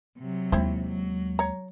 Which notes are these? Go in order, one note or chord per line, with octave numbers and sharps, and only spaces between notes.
C3 F#3
D#2 G#3 C4 E4 C5
F#3
C#5 A#5